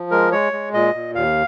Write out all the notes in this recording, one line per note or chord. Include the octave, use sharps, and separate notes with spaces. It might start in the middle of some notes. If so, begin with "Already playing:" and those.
Already playing: F3
G#3 A#4
G#3 C#5
G#3
A#2 D#5
A#2
D#2 F5